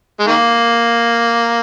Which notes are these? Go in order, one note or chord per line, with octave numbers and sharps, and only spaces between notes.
G#3
D#3 A#3